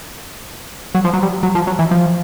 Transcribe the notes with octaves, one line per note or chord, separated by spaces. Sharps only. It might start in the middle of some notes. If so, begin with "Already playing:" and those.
F#3
F3
F#3
G3
F#3
F3
F#3
E3
F3